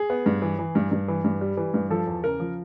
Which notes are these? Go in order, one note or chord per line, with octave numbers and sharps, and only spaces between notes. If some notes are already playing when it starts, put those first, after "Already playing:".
Already playing: G#4
B3
G2
E3
E3
G2
G2
E3
G2
G3
E3
G2
F3 A4
E2
C#3 A#4
F3